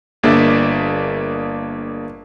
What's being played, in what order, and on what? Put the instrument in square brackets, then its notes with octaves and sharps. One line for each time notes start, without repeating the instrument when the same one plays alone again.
[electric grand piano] G1 A#3 D4 G#4 D5 E5